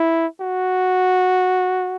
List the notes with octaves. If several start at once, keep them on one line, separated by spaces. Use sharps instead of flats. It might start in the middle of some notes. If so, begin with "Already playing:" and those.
Already playing: E4
F#4